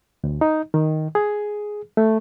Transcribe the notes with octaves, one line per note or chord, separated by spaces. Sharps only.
D2
D#4
D#3
G#4
A3